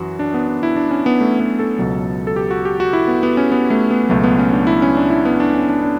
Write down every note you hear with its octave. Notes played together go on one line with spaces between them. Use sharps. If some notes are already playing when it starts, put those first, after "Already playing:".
Already playing: F#2 E3 F#4
D4
B3
D4
E4
D4
C#4
B3
A3
B3
A4
C#2 B2 F#3
A4
G4
F#4
G4
F#4
E4
B3
B3
C#4
B3
A3
B3
C#2 B2 F#3 A3
B3
C#4
D4
E4
C#4
D4
E4
B3
D4
C#4
D4
D4